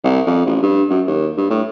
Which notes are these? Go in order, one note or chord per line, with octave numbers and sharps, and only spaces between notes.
C2
F2
A1
G2
F#2
D#2
G2
A2